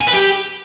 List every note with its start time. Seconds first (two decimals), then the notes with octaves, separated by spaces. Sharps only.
0.01 G#5
0.07 B4
0.13 G4